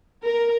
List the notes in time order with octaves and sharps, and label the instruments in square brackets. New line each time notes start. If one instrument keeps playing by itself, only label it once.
[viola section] A#4